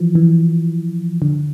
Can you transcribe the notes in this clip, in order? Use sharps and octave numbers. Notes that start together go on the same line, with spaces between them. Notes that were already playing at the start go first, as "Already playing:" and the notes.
Already playing: E3 F3
E3
D3